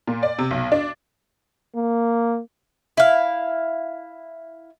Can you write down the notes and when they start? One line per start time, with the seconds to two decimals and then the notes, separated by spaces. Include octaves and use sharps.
0.07 A#2
0.23 D5
0.39 C3
0.51 B1
0.72 D4
1.76 A#3
2.97 E4 F5